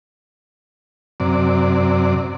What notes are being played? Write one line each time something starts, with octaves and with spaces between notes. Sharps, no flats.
F#2 C3 D5